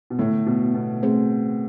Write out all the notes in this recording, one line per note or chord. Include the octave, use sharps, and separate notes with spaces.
B2
A2 D3 A3 E4 A4
B2
B2
A3 C4 G#4 C5